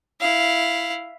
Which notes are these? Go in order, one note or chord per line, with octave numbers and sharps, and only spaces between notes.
E4 F5